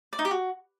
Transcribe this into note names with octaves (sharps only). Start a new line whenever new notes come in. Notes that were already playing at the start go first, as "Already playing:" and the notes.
D5
D#4
G4
F#4